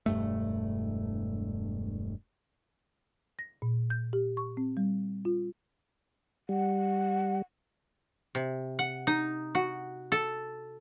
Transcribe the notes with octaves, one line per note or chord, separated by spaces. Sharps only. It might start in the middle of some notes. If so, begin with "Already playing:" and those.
E1 G2 A3
A#6
A#2
G6
G4
C#6
C4
G3
F4
G3 F#5
C3
F#5
D#4
F#4
A4